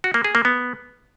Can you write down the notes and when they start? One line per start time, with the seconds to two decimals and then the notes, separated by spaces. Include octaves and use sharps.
0.04 F#4
0.14 A#3
0.24 G#4
0.35 A#3
0.45 B3